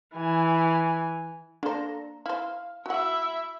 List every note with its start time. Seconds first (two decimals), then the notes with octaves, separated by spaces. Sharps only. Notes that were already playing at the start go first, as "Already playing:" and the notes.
0.15 E3 G#5
1.63 A#3 D4 A4 C5 A#5
2.26 E4 C5 F5
2.86 E4 F#4 E5 F#5